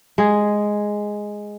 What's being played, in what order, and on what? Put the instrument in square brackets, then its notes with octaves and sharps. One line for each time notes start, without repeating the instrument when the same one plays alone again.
[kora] G#3 G#4